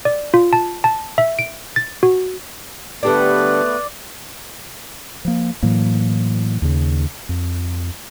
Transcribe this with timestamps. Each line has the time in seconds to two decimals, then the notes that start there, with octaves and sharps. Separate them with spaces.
0.05 D5
0.34 F4
0.53 A5
0.84 A5
1.18 E5
1.39 D7
1.76 A6
2.03 F#4
3.03 D3 G3 A3 B3 D4 B4 D5
5.25 F3 A#3
5.63 A2 E3 F#3 A#3
6.62 D#2 C#3
7.29 F2